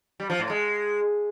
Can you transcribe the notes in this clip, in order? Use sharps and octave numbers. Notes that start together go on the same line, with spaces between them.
G3
F3
A2
G#3